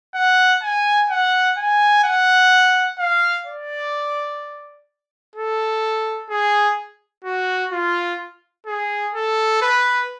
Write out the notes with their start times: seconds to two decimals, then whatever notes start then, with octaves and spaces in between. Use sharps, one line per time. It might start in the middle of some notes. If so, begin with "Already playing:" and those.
0.15 F#5
0.62 G#5
1.09 F#5
1.57 G#5
2.04 F#5
2.98 F5
3.46 D5
5.36 A4
6.30 G#4
7.24 F#4
7.72 F4
8.66 G#4
9.14 A4
9.62 B4